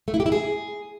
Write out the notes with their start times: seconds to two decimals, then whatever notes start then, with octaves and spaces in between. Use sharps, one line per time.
0.08 A3
0.14 E4
0.20 G4
0.26 E4
0.32 G#4